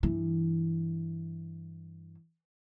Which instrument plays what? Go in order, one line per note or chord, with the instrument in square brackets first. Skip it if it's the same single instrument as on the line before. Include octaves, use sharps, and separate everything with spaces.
[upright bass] G2 E3